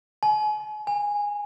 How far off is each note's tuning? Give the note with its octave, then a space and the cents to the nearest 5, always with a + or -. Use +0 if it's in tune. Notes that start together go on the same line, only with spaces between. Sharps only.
G#5 +40
G#5 -15